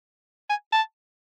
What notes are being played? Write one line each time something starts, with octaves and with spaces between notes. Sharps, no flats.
G#5
A5